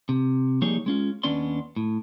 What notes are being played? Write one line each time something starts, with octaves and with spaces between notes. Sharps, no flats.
C3
F3 G3 A#3 D#4 G#4 C#5
G#3 C#4 F4
D#2 B3 C#4 D4 D5 C6
A2